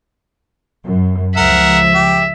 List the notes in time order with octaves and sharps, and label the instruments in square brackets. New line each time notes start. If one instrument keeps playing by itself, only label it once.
[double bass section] F#2
[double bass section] C#2 F3 [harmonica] A#4 F#5 [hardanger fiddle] E5
[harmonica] G4